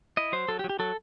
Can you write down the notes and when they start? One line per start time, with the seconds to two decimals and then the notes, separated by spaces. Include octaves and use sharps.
0.17 E4 D#5
0.32 F#3 C5
0.48 F#3 A4
0.59 G4
0.64 F#3
0.70 G4
0.79 F#3 A4